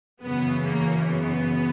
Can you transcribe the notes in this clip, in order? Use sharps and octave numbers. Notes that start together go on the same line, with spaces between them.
F#2 C#3 E3 B3
A#3
B3